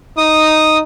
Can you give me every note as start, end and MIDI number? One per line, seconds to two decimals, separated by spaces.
0.17 0.83 63
0.17 0.78 87